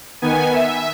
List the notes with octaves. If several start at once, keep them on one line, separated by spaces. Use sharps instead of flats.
D#3 B3 G#5
E5